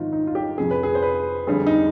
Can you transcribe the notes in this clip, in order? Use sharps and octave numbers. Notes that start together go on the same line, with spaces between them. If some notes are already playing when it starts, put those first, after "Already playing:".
Already playing: G#1 G#2 F3 D#4 F4
D#4
F4
G4
F2 C3 F3 G#4
B4
G#4
C5
B4
G1 F2 D3 G3 G#4
D#4